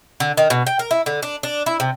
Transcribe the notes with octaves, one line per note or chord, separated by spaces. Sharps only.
D3
D#3
B2
G5
A#4
E4
D3
D4
D4
E4
C3